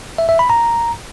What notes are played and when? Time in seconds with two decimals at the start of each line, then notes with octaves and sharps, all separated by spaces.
0.18 E5
0.29 E5
0.39 B5
0.50 A#5